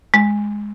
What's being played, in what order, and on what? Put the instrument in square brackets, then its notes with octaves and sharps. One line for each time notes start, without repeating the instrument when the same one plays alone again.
[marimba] G#3